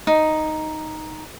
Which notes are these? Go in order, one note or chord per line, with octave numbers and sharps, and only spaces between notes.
D#4